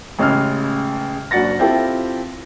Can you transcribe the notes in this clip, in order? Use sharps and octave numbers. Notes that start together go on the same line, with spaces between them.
A1 C#3 G#3 E6 F6
F#1 D4 F#4 F#5 A6 A#6
C4 E4 F4 G4 A4